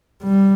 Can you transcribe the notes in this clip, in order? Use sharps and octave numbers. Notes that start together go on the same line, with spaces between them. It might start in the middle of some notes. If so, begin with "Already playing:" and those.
G3